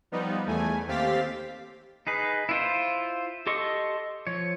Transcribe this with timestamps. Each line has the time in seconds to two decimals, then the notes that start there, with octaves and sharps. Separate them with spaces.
0.12 F3 G3 B3 D#4
0.46 E2 A3 G#5
0.87 D#2 C4 G4 F5 A6 B6
2.07 D#4 G#4 B4
2.49 E4 F4 C5
3.47 G4 A4 D#5 C6 C#6
4.27 F3 C#5